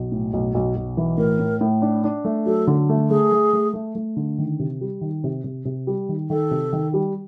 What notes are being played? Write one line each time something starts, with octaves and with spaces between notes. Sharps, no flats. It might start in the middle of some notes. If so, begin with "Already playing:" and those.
Already playing: B1
A2
B1
B1
B1
E3
A2 A#4
A2
A2
D4
D4
A3
F#3 A4
D3
A3
A3 G#4
A3
A3
A3
A3
D3
D#3
C3
G3
D#3
C3
C3
C3
G3
D#3
D#3 A4
C3
D#3
G3